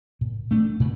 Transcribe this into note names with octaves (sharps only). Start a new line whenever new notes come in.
A#2
A3 D4
A#2